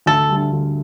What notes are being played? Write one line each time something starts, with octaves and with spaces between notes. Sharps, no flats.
D2 A4
D3 G3
D2